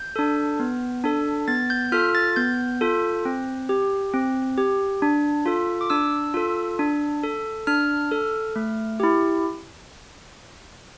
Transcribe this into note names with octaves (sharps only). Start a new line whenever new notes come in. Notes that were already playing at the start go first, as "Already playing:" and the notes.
Already playing: G6
D4 A4
B3
D4 A4
B3 A6
G6
F4 A4 F6
A6
B3 G6
F4 A4
C4
G4
C4
G4
D4
F4 A4
D6
D4 E6
F4 A4
D4
A4
D4 F6
A4
A3
E4 G4